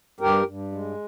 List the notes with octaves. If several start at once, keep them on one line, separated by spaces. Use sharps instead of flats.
G2 G4 A#4
G2
G#3